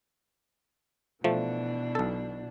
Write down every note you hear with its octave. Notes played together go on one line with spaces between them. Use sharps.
B2 E3 F3 A3 D4
B1 A4